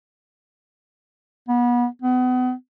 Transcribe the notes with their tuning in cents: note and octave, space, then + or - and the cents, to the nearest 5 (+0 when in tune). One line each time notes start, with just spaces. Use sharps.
B3 -30
B3 +35